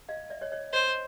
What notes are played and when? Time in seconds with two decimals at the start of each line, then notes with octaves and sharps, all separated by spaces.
0.09 D#5 F5
0.30 D5 E5
0.41 C#5 D#5
0.52 C#5 D#5
0.73 C5 C#5 D#5